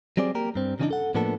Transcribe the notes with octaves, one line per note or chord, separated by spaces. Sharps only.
F#3 G3 C4 G#4 D5
A#3 G4 A#4
G2 C4
C#3 E3 G3 G#3 D4 D#4
A4 F#5
A2 F3 A#3 B3 D4 A4